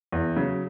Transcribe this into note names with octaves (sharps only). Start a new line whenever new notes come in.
E2
C#3 F#3